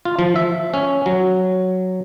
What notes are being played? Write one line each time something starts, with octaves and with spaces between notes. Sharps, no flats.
F4
F3
E5
C#4
F#3